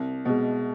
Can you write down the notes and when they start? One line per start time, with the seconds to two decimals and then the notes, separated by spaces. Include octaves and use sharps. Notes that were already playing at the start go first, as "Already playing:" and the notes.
Already playing: C2
0.25 B2 G#3